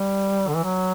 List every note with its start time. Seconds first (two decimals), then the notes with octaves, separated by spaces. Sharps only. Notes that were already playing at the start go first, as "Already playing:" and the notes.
Already playing: G3
0.47 D3
0.55 E3
0.64 F#3